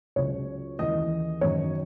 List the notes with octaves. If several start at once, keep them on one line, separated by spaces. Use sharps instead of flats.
C#2 C#3 F#3 C#5
D#2 C#3 E3 D#5
F#2 D#3 F#3 C#5